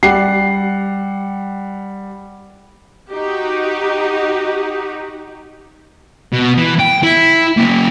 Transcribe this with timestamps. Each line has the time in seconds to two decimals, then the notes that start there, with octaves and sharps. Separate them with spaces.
0.03 G3 F#5 C7
3.12 D#4 F#4 G4
6.32 B2
6.57 E3
6.79 G5
7.03 E4
7.57 A#3 C#4